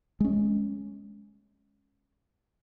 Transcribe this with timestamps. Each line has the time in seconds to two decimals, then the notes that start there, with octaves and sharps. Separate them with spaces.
0.20 G#3 C#4